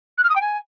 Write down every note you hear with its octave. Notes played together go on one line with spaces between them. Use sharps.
F#6
F6
D#6
G5
G#5